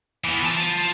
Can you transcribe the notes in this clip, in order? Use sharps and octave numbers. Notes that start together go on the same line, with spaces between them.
E3 B3
F4 A5